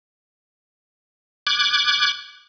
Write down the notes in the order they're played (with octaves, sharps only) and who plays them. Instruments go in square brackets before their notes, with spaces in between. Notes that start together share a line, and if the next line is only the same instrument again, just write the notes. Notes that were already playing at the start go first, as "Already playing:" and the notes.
[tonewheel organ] D6 F#6 G#6